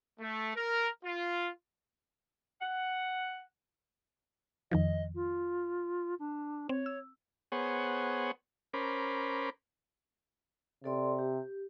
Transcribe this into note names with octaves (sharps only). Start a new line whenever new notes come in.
A3
A#4
F4
F#5
F2 D#3 F3 D#5
F4
D4
C4 C#5
E6
B3 G#4 C5 C#5 F#5
C#4 A#4 C5 B5 D6
C3 A4 D5 C6
G4